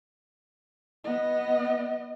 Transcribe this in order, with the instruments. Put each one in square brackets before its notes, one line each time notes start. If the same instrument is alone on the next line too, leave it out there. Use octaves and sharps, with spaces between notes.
[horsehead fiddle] B3 D#5